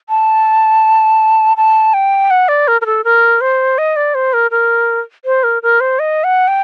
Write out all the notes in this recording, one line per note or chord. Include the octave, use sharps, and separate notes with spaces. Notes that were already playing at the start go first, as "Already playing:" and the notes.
A5
A5
G5
F#5
D5
A#4
A#4
A4
A#4
C5
D#5
D5
C5
A#4
A#4
C5
A#4
A#4
C5
D#5
F#5
G5